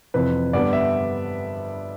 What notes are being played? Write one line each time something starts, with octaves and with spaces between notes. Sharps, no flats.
F2 C3 E3 B4
G2 D3 G3 B3 D4 D5
E5